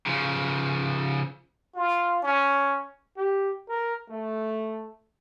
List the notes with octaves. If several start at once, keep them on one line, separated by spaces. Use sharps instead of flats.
C#3 F3
F4
C#4
G4
A#4
A3